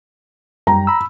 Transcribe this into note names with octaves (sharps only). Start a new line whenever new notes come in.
F#2 G3 G5 A#5
B5 E6